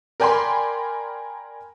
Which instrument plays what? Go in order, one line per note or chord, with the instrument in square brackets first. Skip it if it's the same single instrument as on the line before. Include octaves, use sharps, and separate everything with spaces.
[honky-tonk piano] A#4 D5 G5 G#5 B5 C6